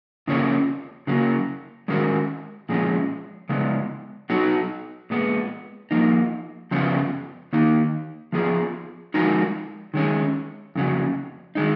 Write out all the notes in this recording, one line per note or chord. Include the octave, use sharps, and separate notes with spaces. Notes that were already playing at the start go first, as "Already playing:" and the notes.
F2 C#3 F3 A#3 C#4
C#3 F#3 A#3
D#3 G#3 C#4 F#4 A#4
A#2 F3 G#3 C#4
C#3 G#3 B3
F#3 B3 D#4 F#4
A#2 G#3 B3
F3 A#3 D#4
F#2 C#3 F3 B3 F4
D#3 A#3 D#4
F3 B3 F4 G#4
F3 G#3 D#4 F#4 A#4
D#3 G#3 C#4
F2 C#3 F#3
D#3 G#3 D#4